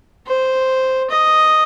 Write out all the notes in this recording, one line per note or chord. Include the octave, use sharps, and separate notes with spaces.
C5
D#5